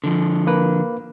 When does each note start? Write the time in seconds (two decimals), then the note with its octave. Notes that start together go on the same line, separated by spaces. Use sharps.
0.04 D3 F3
0.47 A#3 B4